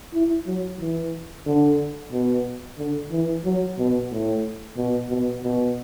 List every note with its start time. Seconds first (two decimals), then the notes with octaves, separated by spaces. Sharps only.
0.14 E4
0.46 F#3
0.80 E3
1.46 D3
2.12 B2
2.78 D3
3.11 E3
3.45 F#3
3.78 B2
4.11 A2
4.77 B2
5.10 B2
5.44 B2